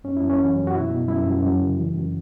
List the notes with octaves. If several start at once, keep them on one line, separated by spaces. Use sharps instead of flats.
F#2 C#4
F#2 E4
C#4
E3
F#2
F#4
B2 E4
B2
F#2 E4
F#2
F#2
C#3
E3
F#2